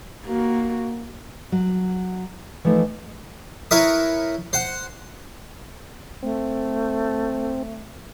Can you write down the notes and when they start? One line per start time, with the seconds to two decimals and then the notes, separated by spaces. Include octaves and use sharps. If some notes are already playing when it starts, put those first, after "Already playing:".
0.25 A#3 F#4
1.52 F#3
2.64 E3 F3 A3 D#4
3.71 E4 A#4 B4 C#5 E5 D#6
4.53 C5 F#5
6.23 A3 C4